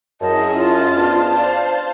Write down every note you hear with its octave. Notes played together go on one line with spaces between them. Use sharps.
F#2 C#4 E4 G#4 D#5 A5
F4 D#5 A6
B3 D4 C5 F5 A5
D5